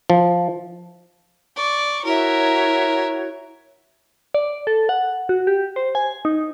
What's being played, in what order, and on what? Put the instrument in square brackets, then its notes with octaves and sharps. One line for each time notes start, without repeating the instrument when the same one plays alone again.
[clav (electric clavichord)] F3
[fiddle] D5 C#6
[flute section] E4 F#4 C#5 [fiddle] A#4 E5
[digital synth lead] D5
A4
F#5
F#4
G4
C5
G#5
D#4